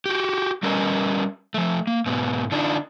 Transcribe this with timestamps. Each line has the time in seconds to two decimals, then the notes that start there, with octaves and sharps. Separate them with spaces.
0.06 F#4 G4
0.63 G3 C#4 A#4 B4 D#5
1.54 F3 A3
1.87 A#3
2.06 G#2 B2 B3
2.52 D3 D4 D#4 F4